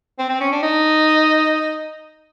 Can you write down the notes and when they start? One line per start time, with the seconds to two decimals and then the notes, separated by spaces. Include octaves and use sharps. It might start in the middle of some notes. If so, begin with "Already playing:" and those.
0.19 C4
0.29 C4
0.40 C#4
0.52 D4
0.63 D#4